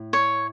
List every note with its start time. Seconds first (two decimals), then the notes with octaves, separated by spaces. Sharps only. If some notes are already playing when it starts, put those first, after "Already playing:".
Already playing: A2
0.13 C#5